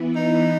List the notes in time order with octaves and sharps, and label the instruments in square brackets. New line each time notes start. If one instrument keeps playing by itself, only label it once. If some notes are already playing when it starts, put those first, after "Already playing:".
Already playing: [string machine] E3 B3 E4
[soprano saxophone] D#4